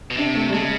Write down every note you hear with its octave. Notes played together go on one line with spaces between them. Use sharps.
B2
C3 D4
A3
G3
C#3 G#3